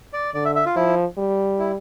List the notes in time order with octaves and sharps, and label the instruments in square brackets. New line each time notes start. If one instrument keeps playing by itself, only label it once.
[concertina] D5
[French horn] D3 [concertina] D5
[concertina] E5
E5
F4
[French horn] F3 [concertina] E4
[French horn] G3
[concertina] E4